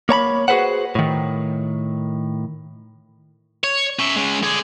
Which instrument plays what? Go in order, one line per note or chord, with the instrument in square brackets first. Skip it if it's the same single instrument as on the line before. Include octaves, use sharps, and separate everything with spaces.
[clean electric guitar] A#3 C#5 A#5 B5
F#4 G#4 A4 B4 C5 F#5
A2 D#3
[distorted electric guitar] C#5
C#4 E5
G#3 C#4
D3 G#4